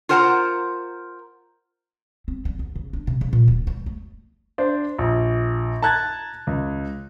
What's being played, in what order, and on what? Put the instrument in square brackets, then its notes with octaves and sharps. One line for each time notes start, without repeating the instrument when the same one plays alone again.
[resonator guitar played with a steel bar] F4 A#4 C5 F#5 A5 A#5
[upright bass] C4
G3
D2
C#3
D4
C3
C#3
A#2
D1
G3
A3
[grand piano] D4 C5 D5
A#1
A5 A#5 F#6 G#6 A6
C#2